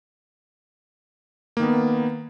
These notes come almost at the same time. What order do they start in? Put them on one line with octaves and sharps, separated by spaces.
A#3 D#3 B3